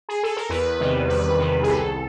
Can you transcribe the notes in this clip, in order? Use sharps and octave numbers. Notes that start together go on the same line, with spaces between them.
G#4
A4
A#4
E2 B4
C3 D#3 G3
E2 B4
C3 D#3 G3
G#4
C2 A4